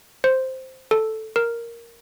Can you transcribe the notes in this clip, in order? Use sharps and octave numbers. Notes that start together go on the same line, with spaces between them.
C5
A4
A#4